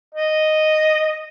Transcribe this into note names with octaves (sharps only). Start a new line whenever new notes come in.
D#5